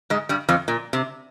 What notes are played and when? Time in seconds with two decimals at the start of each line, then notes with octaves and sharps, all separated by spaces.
0.10 G#2 G#3
0.29 G2 G3
0.49 F2 F3
0.68 A#2
0.93 C3